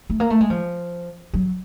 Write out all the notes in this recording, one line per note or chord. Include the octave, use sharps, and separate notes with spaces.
A3
A#3
A3
G#3
F3
F#3